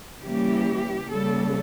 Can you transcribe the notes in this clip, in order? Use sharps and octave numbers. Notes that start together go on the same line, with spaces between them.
C#3 E3 G3 A#3 G4
C#3 G3 A#3 A4